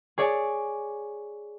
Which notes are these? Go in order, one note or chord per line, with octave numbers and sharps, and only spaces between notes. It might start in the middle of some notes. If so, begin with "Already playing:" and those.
G#4 C#5 D5 G#5